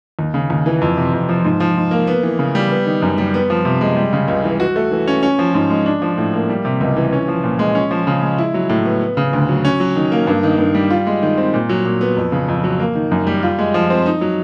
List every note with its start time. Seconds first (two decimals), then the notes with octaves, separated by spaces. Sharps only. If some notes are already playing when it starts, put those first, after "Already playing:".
0.19 D#2
0.34 C#3
0.50 D#2
0.66 E3
0.81 F2
0.97 C3
1.13 F2
1.29 F3
1.45 G#2
1.60 F3
1.76 G#2
1.91 A#3
2.07 B3
2.23 E3
2.39 C#3
2.55 G3
2.71 B3
2.86 D#3
3.02 F#2
3.18 G3
3.34 B3
3.50 F3
3.65 C3
3.81 G#3
3.96 G3
4.13 C#3
4.28 C#2
4.44 E3
4.60 F#4
4.76 A3
4.92 E3
5.07 C#4
5.23 C#4
5.39 F3
5.54 G#2
5.70 G#3
5.86 D4
6.02 F3
6.18 A2
6.33 A#3
6.49 G3
6.65 C3
6.81 C#2
6.97 E3
7.13 C#4
7.28 F3
7.44 A#2
7.59 G#3
7.75 C#4
7.91 F3
8.07 C#3
8.22 G#3
8.38 E4
8.54 F#3
8.69 A2
8.85 B3
9.01 B3
9.17 C#3
9.33 D2
9.49 F#3
9.65 C#4
9.80 F#3
9.96 D#3
10.12 A#3
10.27 G2
10.43 D#3
10.59 G2
10.75 G3
10.90 F4
11.07 G#3
11.22 D#3
11.37 C4
11.54 A#2
11.69 F#3
11.85 A#2
12.01 B3
12.17 F2
12.32 C#3
12.48 F2
12.64 F#3
12.80 A#3
12.95 D#3
13.11 F#2
13.27 G3
13.43 F4
13.59 G#3
13.74 F3
13.90 C4
14.06 D#4
14.21 F#3